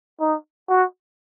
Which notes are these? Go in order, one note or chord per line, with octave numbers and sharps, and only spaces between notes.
D#4
F#4